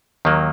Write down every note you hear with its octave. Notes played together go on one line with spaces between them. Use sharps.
D#2 D#3 F#3 A#3